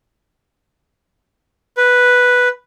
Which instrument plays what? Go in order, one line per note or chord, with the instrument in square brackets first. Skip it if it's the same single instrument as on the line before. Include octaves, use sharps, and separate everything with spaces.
[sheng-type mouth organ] B4